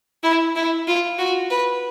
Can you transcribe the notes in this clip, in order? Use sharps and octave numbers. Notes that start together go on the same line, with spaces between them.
E4
E4
F4
F#4
B4